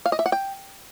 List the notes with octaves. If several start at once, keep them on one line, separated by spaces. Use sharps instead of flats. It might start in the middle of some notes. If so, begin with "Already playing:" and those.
F5
D#5
E5
F#5
G5